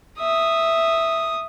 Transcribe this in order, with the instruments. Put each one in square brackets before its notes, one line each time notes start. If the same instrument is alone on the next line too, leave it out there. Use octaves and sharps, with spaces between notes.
[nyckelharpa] E5 [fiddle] D#6